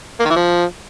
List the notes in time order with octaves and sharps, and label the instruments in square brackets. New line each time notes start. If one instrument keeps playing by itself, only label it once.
[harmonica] A#3
D#3
E3
F3